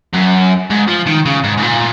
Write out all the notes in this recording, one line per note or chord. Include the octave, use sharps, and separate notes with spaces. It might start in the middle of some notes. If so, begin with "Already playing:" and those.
F#2
G#2
F3
D#3
C#3
G#2
G#2
A#2